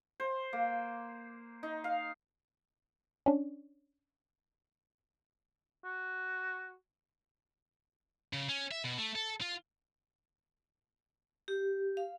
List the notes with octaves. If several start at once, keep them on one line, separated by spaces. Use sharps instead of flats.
C5
A#3
D#4
F5
C#4 D4
F#4
C#3
C#4
E5
B2
A3
A4
F4
G4
F5